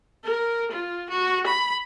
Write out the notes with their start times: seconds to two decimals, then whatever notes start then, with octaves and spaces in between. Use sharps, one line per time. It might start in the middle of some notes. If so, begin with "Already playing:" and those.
0.24 A#4
0.71 F4
1.10 F#4
1.46 B5